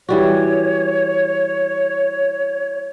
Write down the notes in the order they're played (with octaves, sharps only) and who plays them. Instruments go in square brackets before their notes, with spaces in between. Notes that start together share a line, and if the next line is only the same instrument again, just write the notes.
[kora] E3 G3 F#4 [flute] C#5